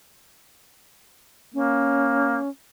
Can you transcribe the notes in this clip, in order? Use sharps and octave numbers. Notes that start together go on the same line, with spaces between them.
A#3 C#4